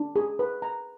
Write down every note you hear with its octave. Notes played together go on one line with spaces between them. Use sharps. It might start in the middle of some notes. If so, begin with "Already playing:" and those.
Already playing: D4
G#4
B4
A#5